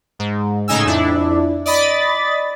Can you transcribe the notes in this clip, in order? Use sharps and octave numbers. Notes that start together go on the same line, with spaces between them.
G#2
A2 C#3 D#4 G#5 E6
F2 D4 E4
D5 D#5 B5 A6